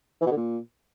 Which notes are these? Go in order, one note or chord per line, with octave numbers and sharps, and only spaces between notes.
E3
B2
D3
A#2